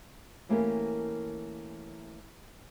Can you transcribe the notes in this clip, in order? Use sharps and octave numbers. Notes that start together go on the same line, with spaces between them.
E3 A3 A#3 C#4 G4 A#4